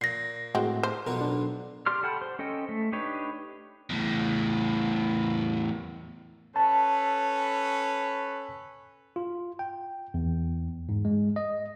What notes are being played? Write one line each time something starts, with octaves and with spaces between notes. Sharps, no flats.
A#2 A#6 C7
A2 G#3 C4 F#4
C5
B1 B2 F4 A#4
D4
G4 D5 C6 F6
A4 F#5 G5 B5
C5
C#4 A4 D#5 G5
A3
D4 D#4 G4 B4 C#5
E2 A2
C#4 A4 B4 A5
F4
G5
E2
G#2
G#3
D#5